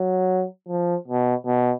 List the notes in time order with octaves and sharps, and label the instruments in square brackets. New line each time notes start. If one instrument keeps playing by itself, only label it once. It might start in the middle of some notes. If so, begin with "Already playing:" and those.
Already playing: [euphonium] F#3
F3
B2
B2